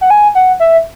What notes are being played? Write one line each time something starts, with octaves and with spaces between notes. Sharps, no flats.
F#5
G#5
F#5
E5